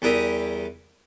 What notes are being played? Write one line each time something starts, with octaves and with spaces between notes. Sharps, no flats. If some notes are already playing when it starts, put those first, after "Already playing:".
E2 G3 E4 A#4 D#6